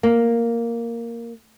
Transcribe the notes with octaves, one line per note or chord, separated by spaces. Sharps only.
A#3